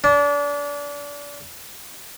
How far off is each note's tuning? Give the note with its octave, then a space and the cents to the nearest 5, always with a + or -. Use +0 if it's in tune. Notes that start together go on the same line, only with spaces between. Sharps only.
D4 -30